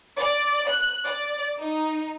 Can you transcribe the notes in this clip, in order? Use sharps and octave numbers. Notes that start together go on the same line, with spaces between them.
D5
F#6
D5
D#4